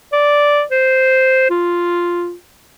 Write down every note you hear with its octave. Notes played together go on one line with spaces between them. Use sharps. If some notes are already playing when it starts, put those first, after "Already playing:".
D5
C5
F4